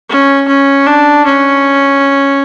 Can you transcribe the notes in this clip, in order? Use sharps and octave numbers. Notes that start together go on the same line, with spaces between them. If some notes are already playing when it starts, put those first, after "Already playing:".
C#4
C#4
D4
C#4